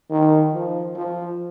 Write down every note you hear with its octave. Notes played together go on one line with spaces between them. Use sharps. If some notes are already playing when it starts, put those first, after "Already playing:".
D#3
F3
F3